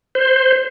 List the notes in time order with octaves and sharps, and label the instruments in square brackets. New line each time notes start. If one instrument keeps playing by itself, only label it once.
[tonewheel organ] C5